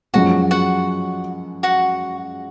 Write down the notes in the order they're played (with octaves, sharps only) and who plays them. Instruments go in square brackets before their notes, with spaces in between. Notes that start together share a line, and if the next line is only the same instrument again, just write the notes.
[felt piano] F#2 F3 G#3 C#4 [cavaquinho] F#4 F#5
[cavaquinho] F#4 F#5
F#4 F#5